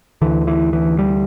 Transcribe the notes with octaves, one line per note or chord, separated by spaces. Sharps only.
D2 D3 E3
E3
E3
G3